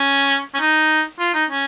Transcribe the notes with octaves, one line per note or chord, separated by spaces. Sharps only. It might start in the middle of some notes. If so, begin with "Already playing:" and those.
Already playing: C#4
C#4
D#4
F4
D#4
C#4